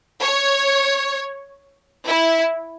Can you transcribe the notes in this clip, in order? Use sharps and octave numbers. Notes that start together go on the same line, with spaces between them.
C#5
E4